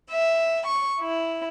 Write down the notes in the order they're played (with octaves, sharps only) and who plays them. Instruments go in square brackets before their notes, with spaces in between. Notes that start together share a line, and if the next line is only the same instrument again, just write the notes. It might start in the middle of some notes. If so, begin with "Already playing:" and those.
[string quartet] E5
C#6
E4